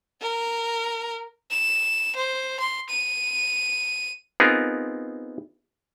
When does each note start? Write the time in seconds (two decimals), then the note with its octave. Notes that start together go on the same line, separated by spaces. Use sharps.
0.21 A#4
1.51 E7
2.16 C5
2.60 C6
2.90 D#7
4.40 B3 C4 D#4 F4 G#4 A#4